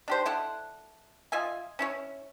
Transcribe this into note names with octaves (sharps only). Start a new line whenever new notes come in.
D4 G4 C5
E4 A4 D5 F#5
F4 D#5 E5 G#5
C#4 E4 C#5